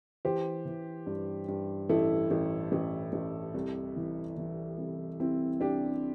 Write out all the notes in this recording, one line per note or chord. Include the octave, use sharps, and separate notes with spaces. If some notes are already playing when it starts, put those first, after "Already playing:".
E3 G4 C5
E3
G2
G2
A1 E4 A4
A1
A1
A1
C2
E3
E3
C2
C2 C4 E4
C2 D4 G4